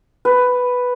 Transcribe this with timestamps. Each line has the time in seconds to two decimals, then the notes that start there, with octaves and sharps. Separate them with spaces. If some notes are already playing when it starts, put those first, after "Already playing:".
0.25 B4